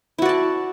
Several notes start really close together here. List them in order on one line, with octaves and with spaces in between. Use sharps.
E4 F#4 D5 A5